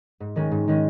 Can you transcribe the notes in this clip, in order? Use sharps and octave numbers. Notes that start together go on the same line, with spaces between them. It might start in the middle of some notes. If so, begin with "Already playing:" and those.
G#2
D#3 G#3 C#4
G#2
D#3 G#3 C#4